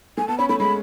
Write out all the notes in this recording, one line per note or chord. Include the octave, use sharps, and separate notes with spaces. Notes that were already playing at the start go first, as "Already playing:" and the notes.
A3 G#5
B3 A5
C#4 B5
A3 B5
G#3 B5